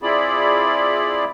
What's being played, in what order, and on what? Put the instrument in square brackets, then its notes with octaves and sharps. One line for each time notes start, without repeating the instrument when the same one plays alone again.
[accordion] C4 E4 F4 G#4 D5 B5